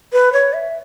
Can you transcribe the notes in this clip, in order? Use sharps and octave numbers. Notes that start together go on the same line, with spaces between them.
B4
C#5
E5